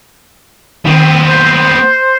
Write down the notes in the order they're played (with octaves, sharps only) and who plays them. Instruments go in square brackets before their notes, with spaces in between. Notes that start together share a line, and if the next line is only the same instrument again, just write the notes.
[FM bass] D#3 [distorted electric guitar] B3 C4
[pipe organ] C5